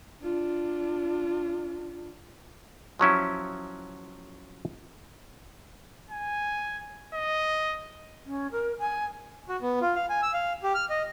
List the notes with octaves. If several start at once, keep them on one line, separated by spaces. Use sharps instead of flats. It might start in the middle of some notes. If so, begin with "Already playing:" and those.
D4 F4
F3 F#3 C#4 E4
G#5
D#5
C#4
A#4
G#5
F#4
B3
F4
F5
G#5
E6
F5
G4
F6
D#5